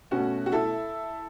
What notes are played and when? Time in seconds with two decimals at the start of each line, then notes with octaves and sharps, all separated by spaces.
0.11 B2 A3 C#4 F#4
0.46 F#4
0.52 E4 A4